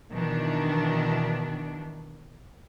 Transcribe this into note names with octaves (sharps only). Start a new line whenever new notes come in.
B2 D#3 E3 D4